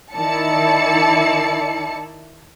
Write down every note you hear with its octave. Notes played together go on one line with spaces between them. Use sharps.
D#3 E4 D5 A5 C#7